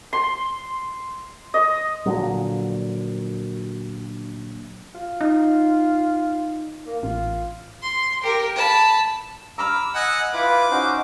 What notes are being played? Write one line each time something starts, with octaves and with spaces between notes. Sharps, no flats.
C6
D#5
A#2 D3 F3 F#3
F4
D#4
A#3
A1 F4
C6
G4 A#4
A5 B5
A#5 B5 D6 E6 F6
D#5 F#5 G#5
E4 F4 B4 D6
C#4 D#4 F#4 C5